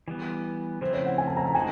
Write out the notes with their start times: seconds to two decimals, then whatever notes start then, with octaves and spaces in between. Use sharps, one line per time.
0.08 E3 G3 B3
0.81 C#3 F3 A3 C4 E4 C5
0.94 C#5
1.06 F#5
1.18 G#5
1.28 A5
1.37 A#5
1.46 A5
1.55 D#3 G#3 C4 D#4 F#4 G#5